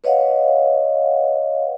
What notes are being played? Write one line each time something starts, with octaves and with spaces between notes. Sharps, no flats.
B4 C#5 D#5 F5 F#5